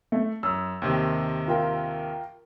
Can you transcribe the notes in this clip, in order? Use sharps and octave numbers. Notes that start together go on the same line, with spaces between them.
A3
F#2 E6
D#2 C3 D#3
F4 A#4 G5